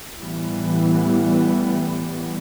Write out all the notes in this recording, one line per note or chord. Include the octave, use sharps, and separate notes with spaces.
A2 E3 G3 B3